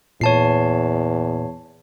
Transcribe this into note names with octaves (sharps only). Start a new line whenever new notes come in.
E2 A#2 C#5 A5 C7